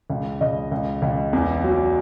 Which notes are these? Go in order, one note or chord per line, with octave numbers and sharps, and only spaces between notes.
C#2
C#2 D#5
C#2
C#2
E2
F#3